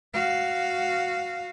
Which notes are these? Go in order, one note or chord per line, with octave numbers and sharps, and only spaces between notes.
F#4 F5